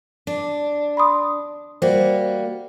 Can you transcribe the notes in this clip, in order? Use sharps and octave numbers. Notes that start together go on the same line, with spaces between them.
D4
B5 C6 D#6
G3 A#3 F#4 C5